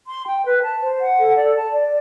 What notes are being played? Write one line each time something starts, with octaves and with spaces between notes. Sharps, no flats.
C6
G5
B4
A5
C5
F#5
A4
D5
A5
D5